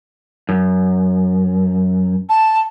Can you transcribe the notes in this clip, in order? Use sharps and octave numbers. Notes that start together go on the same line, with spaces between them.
F#2
A5